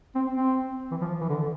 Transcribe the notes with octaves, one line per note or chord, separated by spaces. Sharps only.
C4
C4
E3
F3
E3
D3